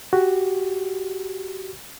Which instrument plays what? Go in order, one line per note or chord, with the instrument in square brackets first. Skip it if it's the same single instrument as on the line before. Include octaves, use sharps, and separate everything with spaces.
[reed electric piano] F#4 G4